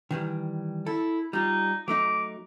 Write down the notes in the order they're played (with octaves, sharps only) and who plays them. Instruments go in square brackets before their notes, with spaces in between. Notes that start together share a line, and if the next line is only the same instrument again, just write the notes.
[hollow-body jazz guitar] D#3 E3 G3
[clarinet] E4 [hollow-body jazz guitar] A4
[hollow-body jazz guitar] G3 F4 [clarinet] D#4
[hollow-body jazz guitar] F#3 A3 D#4 [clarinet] D6